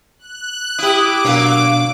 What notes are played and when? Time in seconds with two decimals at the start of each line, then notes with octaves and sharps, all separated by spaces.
0.19 F#6
0.79 E4 G4 D6 D#6
1.25 B2 F#3 A#3 D4 F5